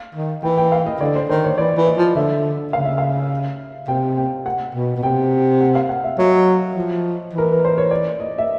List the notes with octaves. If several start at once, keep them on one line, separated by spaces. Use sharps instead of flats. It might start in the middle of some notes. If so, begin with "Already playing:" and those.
Already playing: F5
D#3
E3 G5
G5
F5
D#5
D3 D5
C5
D#3 C5
C#5
E3 D5
E3
D#5
F3
D3 E5
C#3 F5
E5
F5
C3 G5
G5
F#5
B2
B2
C3 G5
F#5
F5
F#5
E5
F#3 D#5
F3
E3 A#4
B4
C5
C#5
D5
D#5
E5